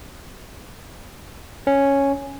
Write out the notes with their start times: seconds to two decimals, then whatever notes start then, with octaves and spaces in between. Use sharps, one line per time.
1.67 C#4